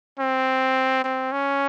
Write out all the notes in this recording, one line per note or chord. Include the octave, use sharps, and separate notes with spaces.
C4
C4
C#4